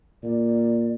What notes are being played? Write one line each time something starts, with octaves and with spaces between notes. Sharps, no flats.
A#2 D5